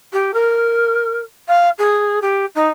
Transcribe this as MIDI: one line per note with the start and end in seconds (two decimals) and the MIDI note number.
0.13 0.31 67
0.34 1.20 70
1.48 1.69 77
1.78 2.19 68
2.22 2.46 67
2.55 2.69 63